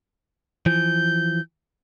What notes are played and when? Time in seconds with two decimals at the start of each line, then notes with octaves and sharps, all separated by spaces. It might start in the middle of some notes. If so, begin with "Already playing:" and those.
0.66 E3 F3 G6